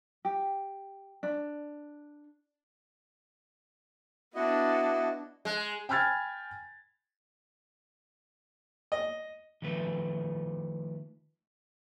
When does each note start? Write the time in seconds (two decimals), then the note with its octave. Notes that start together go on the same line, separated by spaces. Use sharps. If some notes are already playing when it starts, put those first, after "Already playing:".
0.25 G4
1.23 D4
4.35 B3 D4 E4 F#4 D#5
5.45 G#3
5.89 G5 G#5 B5 F6 G#6 A6
8.92 D#5
9.62 D#3 F3 A3 B4